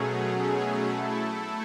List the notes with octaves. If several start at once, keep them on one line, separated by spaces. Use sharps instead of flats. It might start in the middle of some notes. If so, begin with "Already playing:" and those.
Already playing: B2 F#3 A3 C#4 G#4
A3 E4 A4